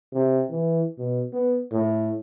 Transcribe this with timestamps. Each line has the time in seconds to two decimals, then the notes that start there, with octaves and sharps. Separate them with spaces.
0.13 C3
0.50 E3
0.98 B2
1.33 B3
1.72 A2